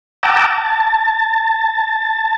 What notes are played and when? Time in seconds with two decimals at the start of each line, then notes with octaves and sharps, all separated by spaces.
0.23 F#5 G5 A5 A#5 D6 E6
0.58 A5